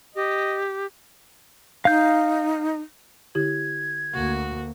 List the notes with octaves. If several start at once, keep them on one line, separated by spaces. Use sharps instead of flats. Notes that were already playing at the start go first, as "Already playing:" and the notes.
G4 D#5
D#4 F5 G6
D3 E4 G4 G#6
D2 A#3 F#4